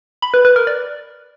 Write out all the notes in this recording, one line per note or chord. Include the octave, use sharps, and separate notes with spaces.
B5
B4
B4
A#4
D5